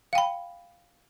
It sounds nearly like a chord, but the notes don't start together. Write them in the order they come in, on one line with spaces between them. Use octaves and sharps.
F5 G5 B5